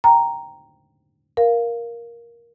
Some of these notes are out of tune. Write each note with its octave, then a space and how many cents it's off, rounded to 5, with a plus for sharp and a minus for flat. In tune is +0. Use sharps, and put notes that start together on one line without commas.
G5 +0 A#5 +0
A#4 +10 F5 +0